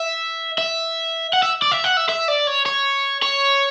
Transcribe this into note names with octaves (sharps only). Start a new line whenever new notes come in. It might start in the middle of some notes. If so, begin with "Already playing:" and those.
Already playing: E5
E5
F#5
E5
D5
E5
F#5
E5
E5
D5
C#5
C#5
C#5